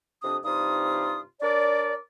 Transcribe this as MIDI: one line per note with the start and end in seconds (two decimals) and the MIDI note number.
0.22 0.37 41
0.22 0.37 48
0.22 0.37 62
0.22 0.37 87
0.44 1.21 43
0.44 1.21 48
0.44 1.21 63
0.44 1.21 65
0.44 1.21 87
1.41 1.94 62
1.41 1.94 70
1.41 1.94 73
1.41 1.94 74